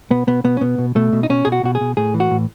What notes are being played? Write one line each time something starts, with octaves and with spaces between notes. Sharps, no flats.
B2 B3
B2 B3
B2 B3
C#4
B2 B3
B2
B2 A3
B2
D#4
B2 C#4
B2 G#4
F#4
B2 F#4
G#4
B2
A2 G#4
E3
F#4
A2